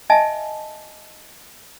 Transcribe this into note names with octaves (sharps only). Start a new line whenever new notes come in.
D#5 E5 G#5 A5